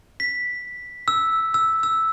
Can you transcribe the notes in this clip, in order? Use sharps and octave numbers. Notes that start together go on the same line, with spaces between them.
B6
E6
E6
E6